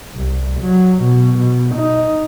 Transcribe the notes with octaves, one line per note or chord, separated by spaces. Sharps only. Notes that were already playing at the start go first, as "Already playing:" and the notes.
C2
F#3
B2
B2
D#4